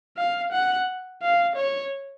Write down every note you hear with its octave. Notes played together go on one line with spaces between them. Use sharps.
F5
F#5
F5
C#5